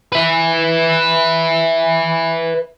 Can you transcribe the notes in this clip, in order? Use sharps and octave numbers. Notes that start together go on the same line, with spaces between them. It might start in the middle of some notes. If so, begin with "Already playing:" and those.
B4 E5